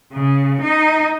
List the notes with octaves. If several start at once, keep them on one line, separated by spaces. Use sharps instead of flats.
C#3
D#4